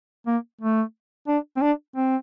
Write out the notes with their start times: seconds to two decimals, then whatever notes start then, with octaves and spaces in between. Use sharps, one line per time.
0.27 A#3
0.61 A3
1.28 D4
1.56 C4
1.61 D4
1.96 C4